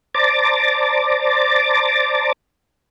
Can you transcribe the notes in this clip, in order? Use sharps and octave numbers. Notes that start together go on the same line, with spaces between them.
C5 D5 A5 A#5 D6 A6